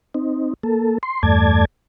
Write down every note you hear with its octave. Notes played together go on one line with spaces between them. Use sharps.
C4 D#4
A#3 A4
C6
E2 G2 A3 D5 A5 G#6